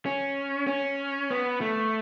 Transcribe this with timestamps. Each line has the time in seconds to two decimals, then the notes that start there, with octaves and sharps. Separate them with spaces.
0.06 C#4
0.67 C#4
1.30 B3
1.61 A3